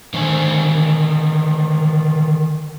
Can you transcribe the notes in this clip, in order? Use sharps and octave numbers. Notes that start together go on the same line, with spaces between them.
D3 D#3 C5 G#5